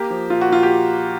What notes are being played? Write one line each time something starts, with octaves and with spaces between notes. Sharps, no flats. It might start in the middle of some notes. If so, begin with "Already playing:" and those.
Already playing: A#3 G4
F3
A#2 F4
F#4
A#2 F4
G4